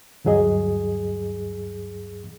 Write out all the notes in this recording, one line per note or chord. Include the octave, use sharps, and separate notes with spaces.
D2 G2 F#3 G#4 D#5